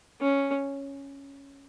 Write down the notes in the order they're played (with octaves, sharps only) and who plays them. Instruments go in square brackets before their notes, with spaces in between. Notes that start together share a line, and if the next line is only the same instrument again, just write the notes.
[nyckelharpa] C#4